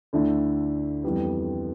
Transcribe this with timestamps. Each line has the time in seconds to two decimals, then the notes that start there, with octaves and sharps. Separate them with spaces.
0.13 D2 D3 A3 E4
1.04 F2 E3 G3 B3